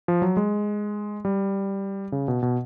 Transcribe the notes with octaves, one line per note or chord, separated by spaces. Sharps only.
F3
F#3
G#3
G3
C#3
B2
B2